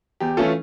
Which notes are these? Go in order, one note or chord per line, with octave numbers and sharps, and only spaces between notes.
E2 G4
E3 A3 C#4 F4 A4